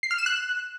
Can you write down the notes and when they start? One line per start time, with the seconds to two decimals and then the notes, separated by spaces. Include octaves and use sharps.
0.03 C7
0.11 F6
0.18 E7
0.26 F#6